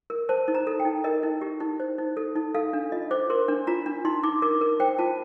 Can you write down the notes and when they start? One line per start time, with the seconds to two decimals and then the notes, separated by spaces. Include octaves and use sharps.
0.10 A#4
0.29 C5 A5
0.48 D#4
0.55 A#5
0.67 A4
0.80 G5
0.85 D#4
1.04 A#4 D#5
1.23 D#4
1.41 G4
1.60 D#4
1.80 C5
1.98 D#4
2.17 A4
2.36 D#4
2.55 A4 F5
2.73 D4
2.92 F4 D#5
3.11 C5 D6
3.30 A#4 C6
3.48 D4
3.67 F4 A#5
3.86 D4
4.05 D#4 C6
4.23 D#4 D6
4.42 A#4 D6
4.61 A#4
4.80 C5 G5
4.98 F4 A5